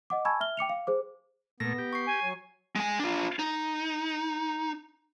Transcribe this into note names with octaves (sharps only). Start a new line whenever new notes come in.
D#5 F#5 D6
G#5 A5 B5 C#6 E6 G#6
E5 F6 G7
G5 D6 C#7 F7
F5
G#4 C5 D6
A#2 A3 B3 A#6
G4
C#6 C7
G#5
F#3 C#5
G#3 G#5
D4 F4
D#4